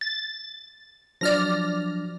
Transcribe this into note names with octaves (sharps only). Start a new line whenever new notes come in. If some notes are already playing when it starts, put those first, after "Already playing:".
A6
F3 F#3 D4 D5 F6 A#6